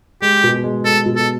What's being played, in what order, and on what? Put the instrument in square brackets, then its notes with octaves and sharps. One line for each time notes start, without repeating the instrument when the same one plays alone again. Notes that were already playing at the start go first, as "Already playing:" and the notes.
[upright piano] G#3 [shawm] G4
[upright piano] B2
G#3
[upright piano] G#3 [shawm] A4
[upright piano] B2
[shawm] A4